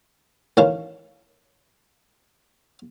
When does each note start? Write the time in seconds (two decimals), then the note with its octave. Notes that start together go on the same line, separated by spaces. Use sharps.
0.57 A1 D#3 C#4 F5 A5